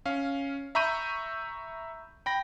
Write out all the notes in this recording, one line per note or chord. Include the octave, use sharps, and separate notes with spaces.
C#4 F5
E5 A#5 B5 C#6 G6 D#7
G5 B5 A#6